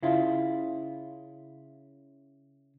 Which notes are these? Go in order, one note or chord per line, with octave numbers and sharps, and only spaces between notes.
C#3 E4 F4